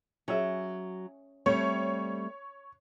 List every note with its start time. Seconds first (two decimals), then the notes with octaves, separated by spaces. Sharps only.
0.28 F#3 C#4 G#4 E5
1.46 G3 A3 C4 C#5